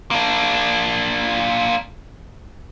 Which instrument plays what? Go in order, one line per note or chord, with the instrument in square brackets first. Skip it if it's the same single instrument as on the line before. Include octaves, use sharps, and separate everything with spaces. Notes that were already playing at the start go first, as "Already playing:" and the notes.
[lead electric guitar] A#3 D4